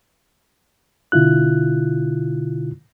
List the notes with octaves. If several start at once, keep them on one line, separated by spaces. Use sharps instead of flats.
B2 D3 E4 F4 F#6